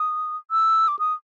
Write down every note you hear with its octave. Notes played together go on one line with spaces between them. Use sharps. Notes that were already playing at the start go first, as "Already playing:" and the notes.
Already playing: D#6
E6
D6
D#6